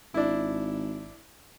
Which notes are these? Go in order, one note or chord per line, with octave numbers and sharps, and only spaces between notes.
G#1 D4 E4